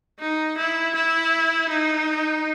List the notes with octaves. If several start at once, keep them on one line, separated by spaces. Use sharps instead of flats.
D#4
E4
E4
D#4